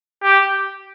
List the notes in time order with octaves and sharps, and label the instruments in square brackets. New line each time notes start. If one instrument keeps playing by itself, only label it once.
[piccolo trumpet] G4